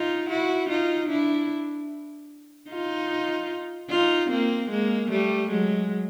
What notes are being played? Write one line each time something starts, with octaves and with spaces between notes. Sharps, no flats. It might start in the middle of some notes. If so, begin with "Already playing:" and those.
Already playing: D#4 F4
E4 F#4
D#4 F4
D4 E4
D#4 F4
D#4 F4
A#3 C4
G#3 A#3
G3 A3
F#3 G#3